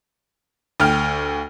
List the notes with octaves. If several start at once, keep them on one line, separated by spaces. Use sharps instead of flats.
D2 G5 F6